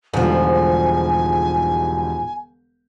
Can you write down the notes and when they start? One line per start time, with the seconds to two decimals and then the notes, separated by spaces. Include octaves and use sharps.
0.14 E1 G#2 D3 F3 G3 G#5